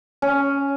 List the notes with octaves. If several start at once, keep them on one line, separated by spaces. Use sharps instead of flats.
C#4